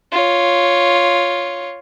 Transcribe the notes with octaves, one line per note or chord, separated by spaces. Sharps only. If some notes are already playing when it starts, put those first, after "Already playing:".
F4 C#5